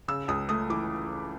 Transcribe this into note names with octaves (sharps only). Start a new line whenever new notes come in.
C#3 E6
C#2 D#6
A3 D#6
E3 D6